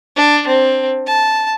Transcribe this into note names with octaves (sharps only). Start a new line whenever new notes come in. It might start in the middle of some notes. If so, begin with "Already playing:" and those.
D4
C4
A5